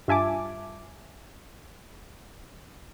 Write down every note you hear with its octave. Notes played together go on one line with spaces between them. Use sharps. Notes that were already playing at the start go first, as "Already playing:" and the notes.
G2 F4 E5 G#5 A5 D6